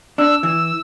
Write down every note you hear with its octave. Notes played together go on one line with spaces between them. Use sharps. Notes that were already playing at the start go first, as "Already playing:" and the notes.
D4 E6
E3 E6